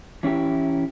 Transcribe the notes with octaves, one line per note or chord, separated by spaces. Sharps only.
E3 C#4 E4 G4